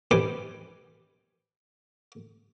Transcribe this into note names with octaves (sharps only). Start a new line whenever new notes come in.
D#3 G4 B4 C5 G#5 D6